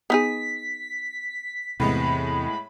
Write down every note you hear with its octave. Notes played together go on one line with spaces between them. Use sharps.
B3 D#4 G#4 B6
E2 A2 C3 G#3 B3 B5